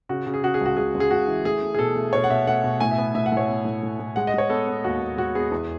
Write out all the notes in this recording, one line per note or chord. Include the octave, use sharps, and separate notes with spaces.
C#3 F#4
C#3
G#4
C#3 F#4
G#4
C#2 F#4
C#2 G#4
C#2
G#4
C#2 F#4
E3
A3 G#4
A3
G#4
B2 A4
A3
B2 C#5
F#5
B2 E5
A3 F#5
B2
A2 G#5
E5
B3
A2 E5
F#5
A2 C#5
B3
A2
A2
A2
G#3 F#5
D#5
G#3 C#5
B3 A4
B3
D#2 F#4
D#2
G#3 F#4
B3 G#4
E2